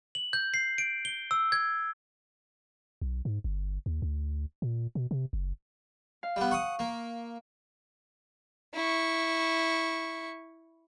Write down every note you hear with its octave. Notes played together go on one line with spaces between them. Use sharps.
F#7
G6
C7
D7
G7
E6
G#6
B1
G#2
G1
D#2
D2
A#2
B2
C3
F#1
F5
G3 B3
F#5 C#6 D#6
A#3
E4 C#6